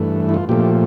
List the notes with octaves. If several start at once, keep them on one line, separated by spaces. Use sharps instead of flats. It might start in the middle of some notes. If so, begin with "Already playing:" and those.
Already playing: G2 E3 A3
E4
F4
A#2 F3 A3 G4